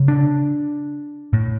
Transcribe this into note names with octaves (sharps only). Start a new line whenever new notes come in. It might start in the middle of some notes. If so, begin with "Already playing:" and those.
Already playing: C#3
D4
A2